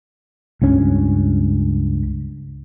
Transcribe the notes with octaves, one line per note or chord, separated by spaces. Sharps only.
C#2 G2 C#4